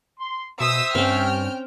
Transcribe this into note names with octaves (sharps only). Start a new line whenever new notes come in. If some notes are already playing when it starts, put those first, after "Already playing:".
C6
B2 C5 E5 D#6 E6
G2 C4 C#4 G5 F6